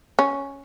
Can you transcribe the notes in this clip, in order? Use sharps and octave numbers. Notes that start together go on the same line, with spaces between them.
C#4